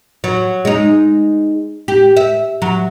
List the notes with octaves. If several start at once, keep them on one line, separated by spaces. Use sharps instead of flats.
F#3
G#3 D#4
G4
E5
F#3